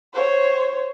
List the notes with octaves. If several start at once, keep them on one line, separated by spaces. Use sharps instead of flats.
C5 C#5